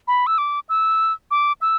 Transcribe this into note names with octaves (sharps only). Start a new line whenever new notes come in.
B5
E6
D6
E6
D6
E6